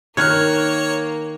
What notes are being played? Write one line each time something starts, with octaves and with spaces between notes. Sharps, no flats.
D#3 A#3 C#5 F6 F#6 G#6 C#7